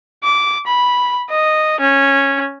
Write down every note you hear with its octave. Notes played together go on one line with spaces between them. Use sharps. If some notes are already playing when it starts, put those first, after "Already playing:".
D6
B5
D#5
C#4